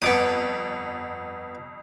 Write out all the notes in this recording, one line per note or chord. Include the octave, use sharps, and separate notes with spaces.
G1 F2 B3 D6 D#6